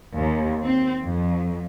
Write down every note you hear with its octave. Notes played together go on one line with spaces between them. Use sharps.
D#2
C4
F2